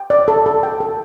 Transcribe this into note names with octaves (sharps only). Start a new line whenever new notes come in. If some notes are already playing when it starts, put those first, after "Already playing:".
Already playing: G5
D5
A4
A4
G5
A4